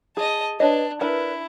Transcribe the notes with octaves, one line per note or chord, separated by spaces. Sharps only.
G#4 D#5 A5
D4 B4 C#5 D#5
D4 E4 A#4 B4